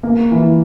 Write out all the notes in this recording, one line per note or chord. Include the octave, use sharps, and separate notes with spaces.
A#3
E3